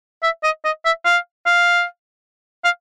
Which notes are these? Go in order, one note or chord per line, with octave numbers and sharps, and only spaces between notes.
E5
D#5
D#5
E5
F5
F5
F5